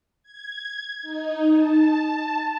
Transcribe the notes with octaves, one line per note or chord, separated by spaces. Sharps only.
G#6
D#4
A5